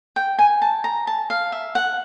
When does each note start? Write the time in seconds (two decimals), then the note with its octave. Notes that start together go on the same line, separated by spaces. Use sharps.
0.16 G5
0.39 G#5
0.62 A5
0.84 A#5
1.07 A5
1.30 F5
1.52 E5
1.75 F#5